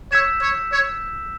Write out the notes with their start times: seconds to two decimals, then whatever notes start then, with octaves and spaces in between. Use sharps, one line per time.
0.11 C#5 E6 G6 B6 E7
0.41 C#5
0.71 C#5